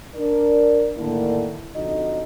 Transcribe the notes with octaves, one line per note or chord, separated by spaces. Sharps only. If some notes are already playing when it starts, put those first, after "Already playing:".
D4 A#4 D5
A2 D3 D#3 A#3 D4 E4
F2 D3 D#4 F#4 D#5